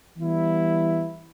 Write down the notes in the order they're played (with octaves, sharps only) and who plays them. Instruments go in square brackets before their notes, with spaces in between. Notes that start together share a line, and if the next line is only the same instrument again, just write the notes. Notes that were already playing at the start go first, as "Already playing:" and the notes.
[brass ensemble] E3 G3 B3 E4